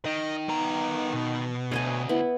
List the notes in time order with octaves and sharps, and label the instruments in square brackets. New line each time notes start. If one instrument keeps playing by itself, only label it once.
[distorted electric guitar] D#3 [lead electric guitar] D#5
[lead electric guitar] B3 A#5
B2
[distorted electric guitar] D2 G#2 [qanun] C#5 D#5 G#5
[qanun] B3 E4